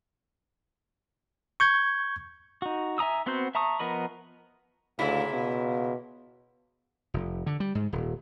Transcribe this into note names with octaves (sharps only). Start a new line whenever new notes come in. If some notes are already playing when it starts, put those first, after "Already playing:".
C#6 G6 G#6
D#4 F#4
E5 G#5 A#5 D#6 E6
B3 C4 F#4 C5 G6
E5 A5 A#5 C#6 D#6
F3 B3 A#4 D#5 B5
D2 A#2 C#3 E4
B2
F1
D3
G3
G#2
D#1